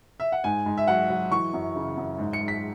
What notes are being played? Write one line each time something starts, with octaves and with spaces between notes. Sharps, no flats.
E5
F#5
G#2 G#5
G#2
E5
F#3 F#5
F#3
E3 C#6
F#2
C#3
F#2
G#2
C#7
G#2
B6